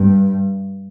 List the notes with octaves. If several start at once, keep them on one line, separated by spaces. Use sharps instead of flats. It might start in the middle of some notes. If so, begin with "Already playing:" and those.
Already playing: G2